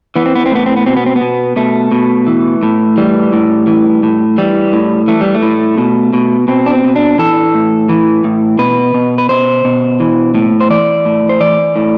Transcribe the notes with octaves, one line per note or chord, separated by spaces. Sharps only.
E3 B3
C4
B3
C4
A2 B3
C4
B3
B2 C4
B3
C4
B3
B2
B2 A3
B2
E3
A2
E3 G3
A2
E3
A2
E3 G3
A2
E3 A3
G3
A3
A2
B2
B2
B2 C4
D4
C4
B2
D4
E3 A4
A2
E3
A2
B2 B4
B2
B4
B2 C5
B2
E3
A2
C5
E3 D5
A2
C5
E3 D5
A2